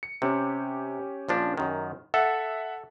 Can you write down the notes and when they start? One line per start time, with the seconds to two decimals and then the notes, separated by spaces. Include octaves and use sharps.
0.03 C#7
0.22 C3 C#4 G4
1.29 A#1 F3 D4
1.57 F#2 D#3
2.14 A4 E5 F#5